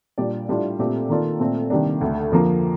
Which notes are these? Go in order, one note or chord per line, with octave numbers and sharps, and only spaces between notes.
A#2 G3 D4 G4 D5
A2 G3 D4 F4
A#2 A3 C4 G4
D#3 A#3 F4 A4 D5
A#2 A3 C4
C3 D#3 G3 A#3 D4
D2 D3 A3
F2 D3 F3 A#3